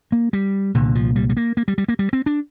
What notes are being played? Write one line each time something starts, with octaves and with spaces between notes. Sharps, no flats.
A#3
G3
C2 A#2 D3
F3
G3
G3
A#3
A#3
G3
G3
A#3
G3
C4
D4